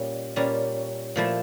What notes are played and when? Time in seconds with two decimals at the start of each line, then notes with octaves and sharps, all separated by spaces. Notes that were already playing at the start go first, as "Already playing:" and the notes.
Already playing: A#2 G3 C#4
0.36 A#2 G3 C#4
1.16 A#2 F3 A3 E4